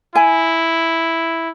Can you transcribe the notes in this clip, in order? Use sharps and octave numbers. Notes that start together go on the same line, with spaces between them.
E4 G#5